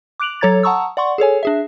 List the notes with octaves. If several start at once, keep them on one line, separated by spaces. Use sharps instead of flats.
D6 F#6 D7 F7 F#7
F#3 A4 C#5 A#5 G#6 A6
F#5 A5 A#5 C#6 D#6 E6
D5 F#5 C6 C#6
G#4 A4 C#5 G#5
D4 G#4 E5